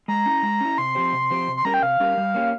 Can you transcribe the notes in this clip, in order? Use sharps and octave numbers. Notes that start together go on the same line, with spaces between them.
G#3 A#5
C#4 E4
G#3
C#4 E4
C3 C6
F3 C4 G4 C5
C3
F3 C4 G4 C5
C3
C6
G3 C#4 G4 A#4 A#5
G5
C3 F5
G3 C#4 G4 A#4
G3
A#3 C#4 G4